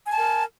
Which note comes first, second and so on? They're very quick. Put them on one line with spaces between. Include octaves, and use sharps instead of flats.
G#5 A5 A#4